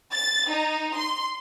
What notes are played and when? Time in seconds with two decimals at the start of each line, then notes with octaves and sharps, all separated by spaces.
0.13 A6
0.50 D#4
0.96 C6